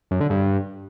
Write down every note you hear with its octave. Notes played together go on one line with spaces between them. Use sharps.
F#2
D3
G2